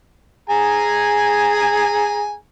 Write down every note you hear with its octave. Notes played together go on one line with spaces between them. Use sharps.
G#4 G#5 A#5